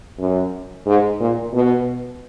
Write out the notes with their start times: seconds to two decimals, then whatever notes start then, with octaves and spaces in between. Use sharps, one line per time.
0.19 F#2
0.86 G#2
1.20 A#2
1.53 B2